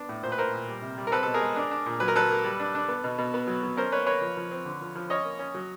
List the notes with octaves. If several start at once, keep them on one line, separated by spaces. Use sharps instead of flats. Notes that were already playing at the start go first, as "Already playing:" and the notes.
Already playing: B3 D4
A2
A#2 C5
B4
A#2 A#4 C5
A#2
G3
C3
G3
A#4
C4 A4 B4
B2 A4
G#4 A#4
G#3
D4
D4
A#2
F#3 B4
A#4
F#3 A4 B4
A#3
G3
D4
D4
B3
B2
B2
B3
F#3
F#3
C#4 A#4 C5
A#3 B4 C#5
A#3 B4 C#5
F3
F3
C4
D3
F3
F3
C#4 C#5 D#5
A#3
C#4
F#3